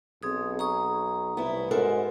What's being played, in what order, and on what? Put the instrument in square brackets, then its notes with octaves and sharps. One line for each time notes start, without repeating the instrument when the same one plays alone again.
[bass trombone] B1 [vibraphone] C4 G#4 D#6
[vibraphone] A#5 C#6 D#6
[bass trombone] C2 [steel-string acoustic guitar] B3 E4
[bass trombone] G#2 [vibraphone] F#4 F#5 G#5 [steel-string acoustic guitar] A4 A#4 C5